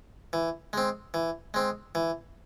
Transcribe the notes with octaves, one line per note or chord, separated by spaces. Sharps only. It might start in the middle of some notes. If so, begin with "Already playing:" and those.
E3
G#3 C4
E3
G#3 C4
E3